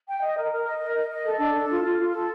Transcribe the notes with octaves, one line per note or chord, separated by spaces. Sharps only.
G5
D#5
A#4
A#4
D#5
A#4
D#5
D#5
A4
D4
A4
F4
F4
F4
A4